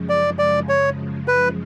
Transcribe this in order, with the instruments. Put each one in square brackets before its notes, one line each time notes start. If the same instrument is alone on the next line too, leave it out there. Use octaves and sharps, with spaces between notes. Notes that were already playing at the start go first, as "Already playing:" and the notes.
Already playing: [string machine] F#2 C#3 F3 G#3
[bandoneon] D5
D5
C#5
B4